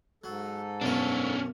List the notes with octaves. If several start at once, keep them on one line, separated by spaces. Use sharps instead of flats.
G#2 F#3 A4
B1 F#2 C#4 D4 A#4